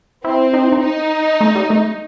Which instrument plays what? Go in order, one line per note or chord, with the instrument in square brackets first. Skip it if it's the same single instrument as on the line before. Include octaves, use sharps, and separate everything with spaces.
[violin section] C4 [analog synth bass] E4
[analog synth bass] D#4
E4
D#4
[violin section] D#4
[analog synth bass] A3
G3
A3